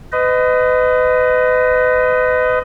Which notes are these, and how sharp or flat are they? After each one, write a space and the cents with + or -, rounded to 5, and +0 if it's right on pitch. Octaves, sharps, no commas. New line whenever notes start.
B4 +35 D#5 +0